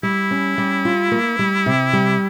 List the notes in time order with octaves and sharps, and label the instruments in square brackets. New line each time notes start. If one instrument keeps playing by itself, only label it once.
[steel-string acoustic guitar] G3 [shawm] E4
[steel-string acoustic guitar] C#4
G3
F4
A#3
G3
C3
G3